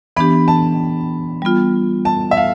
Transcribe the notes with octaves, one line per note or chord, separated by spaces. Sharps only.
E3 B3 D4 G4 B5
A5
G3 B3 F4
A5
E5
F5